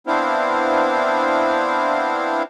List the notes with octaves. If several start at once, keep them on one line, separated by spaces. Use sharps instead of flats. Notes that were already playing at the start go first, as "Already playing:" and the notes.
B3 C4 D4 E4 C5 F5